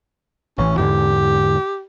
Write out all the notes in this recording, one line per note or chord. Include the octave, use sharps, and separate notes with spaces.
A1 E3 C#4
E2 G#2 D3 G4